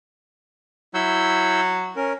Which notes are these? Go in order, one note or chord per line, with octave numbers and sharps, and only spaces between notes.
F#3 E4 E6 G6
C#4 A#4